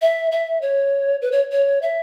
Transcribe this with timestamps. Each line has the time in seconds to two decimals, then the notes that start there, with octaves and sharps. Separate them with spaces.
0.02 E5
0.32 E5
0.62 C#5
1.22 B4
1.32 C#5
1.52 C#5
1.82 E5